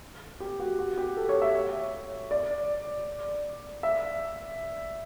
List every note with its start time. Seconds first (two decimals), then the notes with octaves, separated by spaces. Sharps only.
0.40 G4
0.59 F#4
0.79 F#4
0.97 G4
1.17 A4
1.29 C#5
1.42 E5
1.55 C#5
2.31 D5
3.83 E5